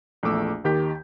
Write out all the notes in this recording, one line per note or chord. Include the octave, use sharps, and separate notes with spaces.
A#1 E2 A3 D6 E6
D#2 D#3 G4 G6 B6